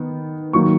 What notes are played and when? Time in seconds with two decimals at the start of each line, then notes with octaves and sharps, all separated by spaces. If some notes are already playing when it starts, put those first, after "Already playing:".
Already playing: D#3 B3
0.53 D#3 F#3 A#3 C#6